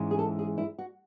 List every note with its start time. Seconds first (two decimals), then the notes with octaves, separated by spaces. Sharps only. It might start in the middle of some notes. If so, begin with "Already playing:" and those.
Already playing: G#2 E3 G#3 C#4
0.11 G#4
0.19 A4
0.39 G#4
0.58 E4
0.78 F#4